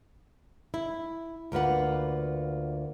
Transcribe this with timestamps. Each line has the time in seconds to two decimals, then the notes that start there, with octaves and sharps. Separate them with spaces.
0.74 E4
1.52 D2 A#3 F4 B4 F#5